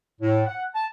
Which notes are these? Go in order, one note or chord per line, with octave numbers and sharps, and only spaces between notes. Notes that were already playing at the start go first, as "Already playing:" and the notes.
A2
F#5
A5